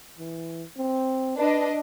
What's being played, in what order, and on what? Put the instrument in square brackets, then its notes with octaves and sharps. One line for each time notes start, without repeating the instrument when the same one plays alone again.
[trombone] E3
C4
[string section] D4 D#5 [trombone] B4